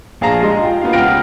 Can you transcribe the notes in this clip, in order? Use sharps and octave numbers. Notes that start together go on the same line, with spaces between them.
A#1 G#4 F5 A5 A#5 A#6
G#3 D#5 C6
F4 G5
A#3 B3 F4 G4 F5
C#2 F#5 G5 F6 A#6 D7